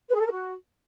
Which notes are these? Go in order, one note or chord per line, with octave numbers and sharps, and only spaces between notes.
B4
G#4
A4
A#4
F#4